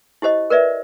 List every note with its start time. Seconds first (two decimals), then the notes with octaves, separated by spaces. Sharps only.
0.22 E4 G4 C5 D#5
0.50 A#4 B4 D5 E5